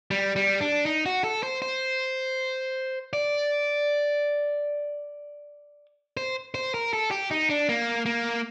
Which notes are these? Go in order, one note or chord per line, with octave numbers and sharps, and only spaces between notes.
G3
G3
D4
D#4
F#4
A4
C5
C5
D5
C5
C5
A#4
A4
G4
D#4
D4
A#3
A#3